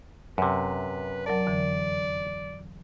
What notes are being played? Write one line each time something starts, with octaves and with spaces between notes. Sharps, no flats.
F#2 C3 B4
F#3 A#4 D5 A5
F2 D3 E3